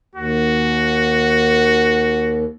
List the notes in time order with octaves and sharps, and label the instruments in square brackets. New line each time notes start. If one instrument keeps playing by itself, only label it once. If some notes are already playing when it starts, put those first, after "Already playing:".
[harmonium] D#2 [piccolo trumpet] F#4